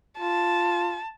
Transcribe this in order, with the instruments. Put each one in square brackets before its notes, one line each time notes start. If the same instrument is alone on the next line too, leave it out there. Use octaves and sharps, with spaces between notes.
[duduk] F4 [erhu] A5